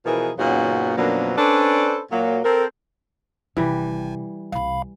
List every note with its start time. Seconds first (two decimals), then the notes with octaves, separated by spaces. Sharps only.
0.05 B2 E3 F3 G#4 A#4
0.38 F#2 A#2 C#3 B3 D#4 F#4
0.96 F#2 B2 F3 F#3 A#3 D4
1.37 C#4 D4 A4 B4 C5 D5
2.11 A#2 F#3 A#3
2.44 C4 A4 A#4
3.57 G#1 C3 E3 G3
4.52 C2 C3 F5 B5